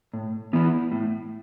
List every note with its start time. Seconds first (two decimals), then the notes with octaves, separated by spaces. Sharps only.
0.14 A2
0.53 E3 B3 E4
0.92 A2